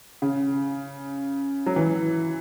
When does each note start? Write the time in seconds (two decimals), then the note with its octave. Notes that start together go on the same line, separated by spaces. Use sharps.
0.22 C#3
1.66 F#3
1.76 E3